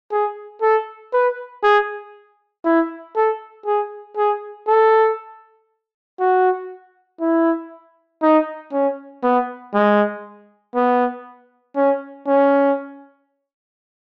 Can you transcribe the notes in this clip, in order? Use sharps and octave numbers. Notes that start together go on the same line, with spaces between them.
G#4
A4
B4
G#4
E4
A4
G#4
G#4
A4
F#4
E4
D#4
C#4
B3
G#3
B3
C#4
C#4